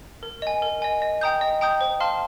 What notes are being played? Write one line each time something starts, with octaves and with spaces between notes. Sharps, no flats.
A#4
D#5 G#5
A#4
D#5 G#5
D#5
G5 A#5 D#6 G6
D#5
G5 A#5 D#6 G6
C5
F5 A5 C6 F6